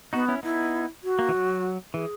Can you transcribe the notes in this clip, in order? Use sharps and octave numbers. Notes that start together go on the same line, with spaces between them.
B3 D#4 F#4
C#4 E4
B3 D#4 E4
F#4
A#3
E3
F#3
E3 G#4